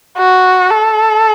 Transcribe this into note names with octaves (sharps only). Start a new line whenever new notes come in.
F#4
A4